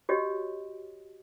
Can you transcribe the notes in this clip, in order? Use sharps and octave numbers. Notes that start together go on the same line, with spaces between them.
F#4 G4 C#5 D#5